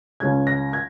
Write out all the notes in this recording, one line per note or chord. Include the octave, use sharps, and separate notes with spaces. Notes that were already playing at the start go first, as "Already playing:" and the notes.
C#2 C#3 G#3 C#4 G#6
A#6
G#6